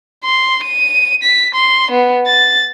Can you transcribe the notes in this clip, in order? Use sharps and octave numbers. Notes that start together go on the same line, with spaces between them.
C6
D#7
B6
C6
B3
A6